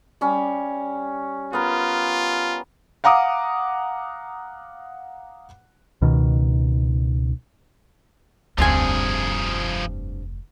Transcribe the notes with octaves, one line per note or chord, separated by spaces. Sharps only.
G3 C#4
B3 F4 A#4
F5 F#5 A#5 D6 D#6
C#2 B2 D#3
F1 D2 G2 F3 C4 G#4 G#5